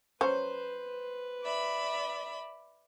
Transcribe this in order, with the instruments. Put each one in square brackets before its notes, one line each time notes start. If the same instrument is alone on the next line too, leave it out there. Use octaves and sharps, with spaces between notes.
[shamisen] F#3 C#4 [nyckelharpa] B4 [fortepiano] C5
[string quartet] D5 E5 B5